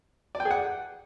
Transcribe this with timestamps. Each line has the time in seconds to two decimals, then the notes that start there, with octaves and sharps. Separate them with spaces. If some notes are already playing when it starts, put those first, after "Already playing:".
0.35 D5
0.40 G5
0.45 G#4
0.51 F#5